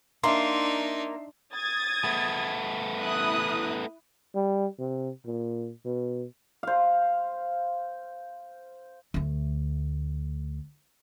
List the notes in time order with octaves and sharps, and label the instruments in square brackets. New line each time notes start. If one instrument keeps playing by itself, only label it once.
[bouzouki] A#3 [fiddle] D4 D#4 [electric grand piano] E5 C6
[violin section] D#6 G#6 A6
[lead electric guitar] A3 B3
[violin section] E4 D#6 F#6
[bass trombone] G3
C3
A#2
B2
[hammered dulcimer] C5 F5
[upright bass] D2 A3